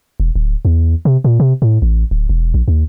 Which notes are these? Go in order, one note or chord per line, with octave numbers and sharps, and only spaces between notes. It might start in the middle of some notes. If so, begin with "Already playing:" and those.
E1
D1
E2
C3
A#2
C3
A2
A1
D1
E1
A#1
D#2